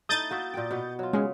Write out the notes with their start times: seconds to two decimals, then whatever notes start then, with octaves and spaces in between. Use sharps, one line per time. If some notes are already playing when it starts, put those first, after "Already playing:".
0.09 A3 D#4 E4 D#6 G6 A6
0.31 A#3 F#4 E5
0.54 A#2 G5
0.71 B2 B3
0.99 F#3 F4
1.13 C#3 G#3